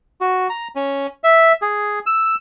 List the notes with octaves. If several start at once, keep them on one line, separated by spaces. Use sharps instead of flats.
F#4
A#5
C#4
E5
G#4
E6